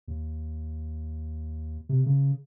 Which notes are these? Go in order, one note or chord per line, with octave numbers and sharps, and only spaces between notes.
D#2
C3
C#3